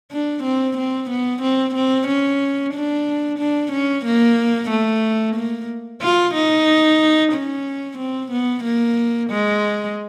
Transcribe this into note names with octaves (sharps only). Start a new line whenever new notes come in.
D4
C4
C4
B3
C4
C4
C#4
D4
D4
C#4
A#3
A3
A#3
F4
D#4
C#4
C4
B3
A#3
G#3